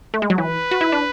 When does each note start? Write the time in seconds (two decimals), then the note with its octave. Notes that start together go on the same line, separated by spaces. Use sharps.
0.14 A3
0.22 G#3
0.30 F#3
0.38 E3 B4
0.71 F#4
0.81 E4
0.92 D4